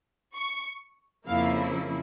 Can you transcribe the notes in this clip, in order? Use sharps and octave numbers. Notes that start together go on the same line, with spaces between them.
C#6
F2 C#3 F3 A#3 E4 F5